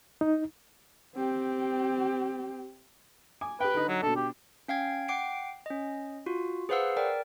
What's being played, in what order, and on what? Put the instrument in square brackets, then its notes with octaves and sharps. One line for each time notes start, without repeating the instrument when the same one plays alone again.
[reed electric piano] D#4
[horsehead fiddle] C4 G4
[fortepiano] G#5 D6
[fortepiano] G4 G5 [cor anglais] B4
[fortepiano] D3 D#4
[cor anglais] F#3
[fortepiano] B2 D4 [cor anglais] A4
[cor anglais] G4
[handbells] C#4 F5 G5 G#6
F#5 G5 D6 C7 D7
C#4 D#5
F4 F#4
G#4 B4 C5 F5 F#5 E6
A#4 D5 G5